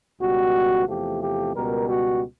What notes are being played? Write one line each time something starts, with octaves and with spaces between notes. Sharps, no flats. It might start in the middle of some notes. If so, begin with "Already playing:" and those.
C#2 B2 G3 F#4
E2 C3 F3 A3 G4
G4
C#2 B2 G3 A#4
F#4